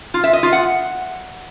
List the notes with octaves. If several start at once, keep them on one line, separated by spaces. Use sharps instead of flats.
F4
E5
D#5
F4
F#5